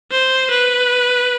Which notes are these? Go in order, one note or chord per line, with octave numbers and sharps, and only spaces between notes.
C5
B4